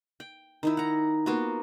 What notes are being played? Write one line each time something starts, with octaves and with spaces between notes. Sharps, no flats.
G5
D#3 D#4 E4
F#5 A#5
A#3 B3 F4 F#4